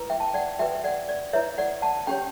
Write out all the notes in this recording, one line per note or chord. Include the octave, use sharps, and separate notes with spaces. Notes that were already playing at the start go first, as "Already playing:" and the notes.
Already playing: E4 B4
E5 G5
A5
G5
D5 F#5
F#4 B4 E5 G5
E5
D5 F#5
D5
E4 B4 C#5 E5
D5 F#5
F#5 A5
C#4 G4 C#5 G5 B5